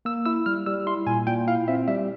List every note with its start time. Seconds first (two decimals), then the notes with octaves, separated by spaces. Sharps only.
0.05 A#3 E6
0.26 E4 E6
0.46 G3 F6
0.66 G3 E6
0.87 E4 C6
1.07 A#2 G#5
1.27 A#2 G5
1.48 E4 F5
1.68 C4 E5
1.88 G3 E5